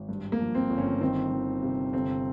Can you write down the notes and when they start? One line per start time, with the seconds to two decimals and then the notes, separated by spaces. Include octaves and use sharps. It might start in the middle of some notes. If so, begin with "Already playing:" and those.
Already playing: G#1
0.09 G2
0.32 A#3
0.40 F3
0.55 C4
0.70 G1
0.78 C#4
1.01 D#3 C4
1.32 D#3
1.63 C3
1.93 G1 C4